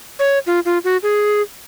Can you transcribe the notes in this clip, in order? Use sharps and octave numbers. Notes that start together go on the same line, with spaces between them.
C#5
F4
F4
F#4
G#4